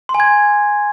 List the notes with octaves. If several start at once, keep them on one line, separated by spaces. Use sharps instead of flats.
C6
G#5
G#6